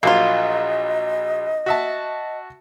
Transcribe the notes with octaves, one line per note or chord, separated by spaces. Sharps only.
A#1 F#3 A#3 F4 D#5
F#4 E5 A5